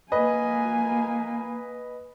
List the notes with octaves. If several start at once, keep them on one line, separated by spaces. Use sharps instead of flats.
A#3 B4 D#5 G#5